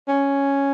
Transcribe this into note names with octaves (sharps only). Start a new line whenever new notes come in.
C#4